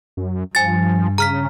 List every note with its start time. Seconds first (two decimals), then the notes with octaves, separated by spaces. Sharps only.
0.17 F#2
0.55 G2 F3 G#5 A6
1.18 C#3 A#5 F6 B6